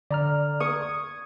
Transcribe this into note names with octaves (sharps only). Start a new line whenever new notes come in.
D3 D5 A#5 F6
C#6 D#6 G#6